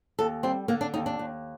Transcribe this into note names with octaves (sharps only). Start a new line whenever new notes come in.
D#2 A4
G3 C4
D3 A#3
D4
D#2 D#4
D4
D#2